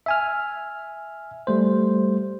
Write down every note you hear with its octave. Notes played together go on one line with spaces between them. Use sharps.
E5 G#5 F6
G3 A3 C5